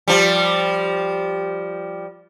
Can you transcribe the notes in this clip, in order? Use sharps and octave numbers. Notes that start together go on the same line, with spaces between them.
F3 G3